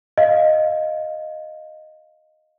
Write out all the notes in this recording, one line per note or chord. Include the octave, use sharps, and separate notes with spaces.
D#5 F5